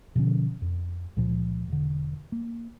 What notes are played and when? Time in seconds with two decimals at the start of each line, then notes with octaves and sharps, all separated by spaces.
0.16 B2 D3 F3 C#4
0.62 F2
1.17 C#2 A#2 F3
1.68 E1 D3
2.32 A#3